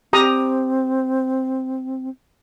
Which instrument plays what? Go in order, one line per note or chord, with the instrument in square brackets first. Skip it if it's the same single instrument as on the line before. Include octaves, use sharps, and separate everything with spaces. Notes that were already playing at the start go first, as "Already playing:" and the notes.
[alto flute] C4 [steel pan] G4 A#5 D#6